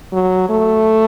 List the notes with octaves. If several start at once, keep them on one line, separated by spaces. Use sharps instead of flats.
F#3
A3